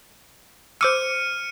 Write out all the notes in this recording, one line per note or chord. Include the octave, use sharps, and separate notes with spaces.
C5 D6 E6 F6 C#7 D#7